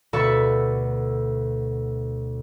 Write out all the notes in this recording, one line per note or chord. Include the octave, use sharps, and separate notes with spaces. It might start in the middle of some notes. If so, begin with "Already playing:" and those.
D2 B2 A4 B4 E5 C#6